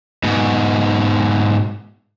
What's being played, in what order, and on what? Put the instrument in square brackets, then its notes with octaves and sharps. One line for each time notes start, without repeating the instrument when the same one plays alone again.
[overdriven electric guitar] G#2 B2